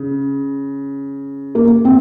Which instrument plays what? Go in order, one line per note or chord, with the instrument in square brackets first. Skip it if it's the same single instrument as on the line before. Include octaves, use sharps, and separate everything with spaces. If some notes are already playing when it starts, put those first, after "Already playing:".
Already playing: [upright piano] C#3
[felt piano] A#3
C4